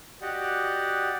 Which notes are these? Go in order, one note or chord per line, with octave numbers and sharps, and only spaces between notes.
F#4 G4 D5 D#5 F#5